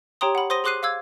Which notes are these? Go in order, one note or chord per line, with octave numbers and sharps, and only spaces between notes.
G4 C#5 G5 A#5 C6 D#6
F#5 B5
C5 C6 D#6 A#6 D#7 G7
G#4 C6 D6 F#6 C7 D#7
F5 D6 E6 G#6